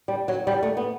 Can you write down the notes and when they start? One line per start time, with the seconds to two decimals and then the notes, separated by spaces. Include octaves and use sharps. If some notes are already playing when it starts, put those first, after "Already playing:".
0.08 G3
0.28 F#3
0.47 G3
0.63 A3
0.77 B3